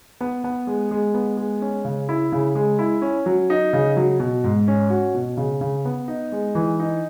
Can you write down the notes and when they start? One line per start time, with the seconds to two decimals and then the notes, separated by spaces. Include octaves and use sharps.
0.21 B3
0.44 B3
0.67 G#3
0.91 G#3
1.14 B3
1.37 G#3
1.62 C#4
1.85 C#3
2.09 E4
2.32 C#3
2.55 G#3
2.79 E4
3.02 C#4
3.26 F#3
3.50 D#4
3.73 C#3
3.97 F#3
4.20 B2
4.44 G#2
4.68 C#4
4.90 F#4
5.14 B2
5.37 C#3
5.61 C#3
5.85 B3
6.08 D#4
6.32 G#3
6.55 E3
6.80 D#4